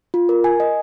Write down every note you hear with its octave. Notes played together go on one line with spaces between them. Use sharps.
F4
A#4
G#5
D#5